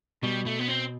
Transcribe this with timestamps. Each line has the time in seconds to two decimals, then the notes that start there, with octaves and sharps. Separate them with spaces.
0.23 B2 G3
0.46 A3
0.59 B3
0.68 C4